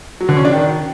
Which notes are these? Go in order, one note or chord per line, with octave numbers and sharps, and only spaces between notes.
F#3
D3
C#4
D4
D#3